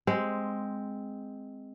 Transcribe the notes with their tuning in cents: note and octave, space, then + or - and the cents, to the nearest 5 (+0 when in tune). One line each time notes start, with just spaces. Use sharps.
G#3 +0 C4 +0